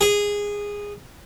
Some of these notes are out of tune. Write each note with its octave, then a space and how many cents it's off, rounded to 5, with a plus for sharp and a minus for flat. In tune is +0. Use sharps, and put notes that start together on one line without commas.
G#4 -15